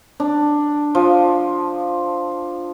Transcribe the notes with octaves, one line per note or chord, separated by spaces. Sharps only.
D4
F3